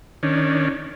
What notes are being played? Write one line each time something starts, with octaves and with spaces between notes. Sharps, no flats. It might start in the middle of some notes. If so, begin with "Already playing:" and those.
D#3 C#4 D4